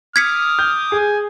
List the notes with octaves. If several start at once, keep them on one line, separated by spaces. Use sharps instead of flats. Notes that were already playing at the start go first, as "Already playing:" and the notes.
D6 D#6 F6 G#6 B6 C#7
G6
G#4 G#5